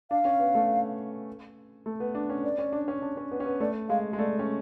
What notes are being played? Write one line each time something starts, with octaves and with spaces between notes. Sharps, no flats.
D4 F5
C#4
B3
A3
A3
B3
D4
C#4
D5
C#4
D4
C#4
D4
C#4
B3
C#4
B3
A3 D5
G#3 F5
G#3
A3 D5
C#4